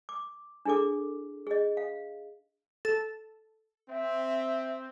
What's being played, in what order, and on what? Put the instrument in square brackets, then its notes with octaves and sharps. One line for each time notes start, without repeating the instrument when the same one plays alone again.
[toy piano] D6
D4 E4 G#4 A4 D6
G#4 D#5
F5
[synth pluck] A4
[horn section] C4 [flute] E5